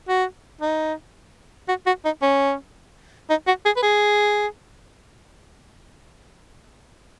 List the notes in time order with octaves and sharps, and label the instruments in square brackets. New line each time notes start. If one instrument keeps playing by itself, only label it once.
[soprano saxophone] F#4
D#4
F#4
F#4
D#4
C#4
D#4
F#4
G#4
B4
G#4